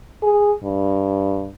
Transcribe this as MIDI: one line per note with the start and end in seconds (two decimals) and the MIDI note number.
0.23 0.53 68
0.64 1.51 43